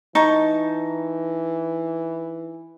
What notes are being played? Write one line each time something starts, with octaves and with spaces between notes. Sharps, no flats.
E3 D#4 A5 C#6